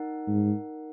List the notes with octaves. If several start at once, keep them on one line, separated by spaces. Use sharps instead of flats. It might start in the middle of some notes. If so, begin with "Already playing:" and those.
Already playing: D#4 A#4 F#5
G#2